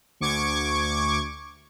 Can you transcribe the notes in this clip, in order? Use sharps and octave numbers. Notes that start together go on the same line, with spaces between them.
D2 C#6 D6 G#6